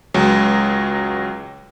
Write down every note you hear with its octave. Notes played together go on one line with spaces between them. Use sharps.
C#2 F#3 G#3